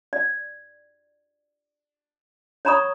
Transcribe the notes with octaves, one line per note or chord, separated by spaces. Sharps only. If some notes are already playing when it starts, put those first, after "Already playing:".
D5
C#5 D5 A#5 B5 C#6 D#6